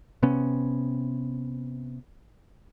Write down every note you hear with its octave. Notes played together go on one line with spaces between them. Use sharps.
C3 B3 C#4